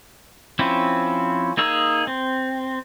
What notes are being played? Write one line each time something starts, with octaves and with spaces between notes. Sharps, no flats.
F3 C4 C#4 E4
A#3 D#4 G#4 E6
C4